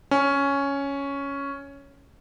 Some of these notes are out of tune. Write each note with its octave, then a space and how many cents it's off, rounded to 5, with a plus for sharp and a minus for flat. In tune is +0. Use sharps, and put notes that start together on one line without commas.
C#4 +5